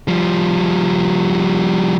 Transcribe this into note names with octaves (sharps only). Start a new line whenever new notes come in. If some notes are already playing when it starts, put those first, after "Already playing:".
F3 G3